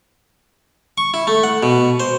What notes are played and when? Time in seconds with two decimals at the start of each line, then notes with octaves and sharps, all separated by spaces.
0.98 C#6
1.14 E4
1.27 A3
1.44 F#5
1.63 B2
2.00 C5